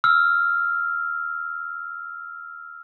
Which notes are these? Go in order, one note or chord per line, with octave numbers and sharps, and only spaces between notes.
E6 F6